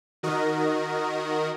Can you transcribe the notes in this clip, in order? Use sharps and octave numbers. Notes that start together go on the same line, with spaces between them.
D#3 F#4 A#4 D#5